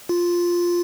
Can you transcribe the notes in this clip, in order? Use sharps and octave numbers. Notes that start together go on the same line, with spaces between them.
F4